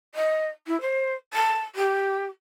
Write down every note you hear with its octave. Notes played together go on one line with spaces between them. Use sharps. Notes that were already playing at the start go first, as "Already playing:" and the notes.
D#5
E4
C5
A5
G4